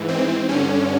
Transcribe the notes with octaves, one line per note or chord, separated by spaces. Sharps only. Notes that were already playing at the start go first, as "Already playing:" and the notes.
Already playing: G#2 E3
C4
G2 D3 C#4